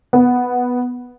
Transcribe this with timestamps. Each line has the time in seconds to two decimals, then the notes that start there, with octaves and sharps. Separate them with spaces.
0.13 B3